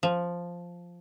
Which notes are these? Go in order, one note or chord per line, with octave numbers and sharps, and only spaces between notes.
F3